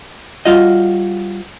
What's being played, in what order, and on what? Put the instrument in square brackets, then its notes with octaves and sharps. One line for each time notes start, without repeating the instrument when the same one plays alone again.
[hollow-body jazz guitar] G3 F4 F#4 D#5